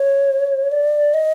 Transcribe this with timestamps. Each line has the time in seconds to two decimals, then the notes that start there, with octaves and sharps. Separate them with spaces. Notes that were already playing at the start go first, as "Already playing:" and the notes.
Already playing: C#5
0.72 D5
1.14 D#5